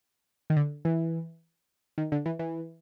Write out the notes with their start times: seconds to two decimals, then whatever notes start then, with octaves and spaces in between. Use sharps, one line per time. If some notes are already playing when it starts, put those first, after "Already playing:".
0.50 D#3
0.56 D3
0.85 E3
1.98 D#3
2.12 D3
2.26 E3
2.39 E3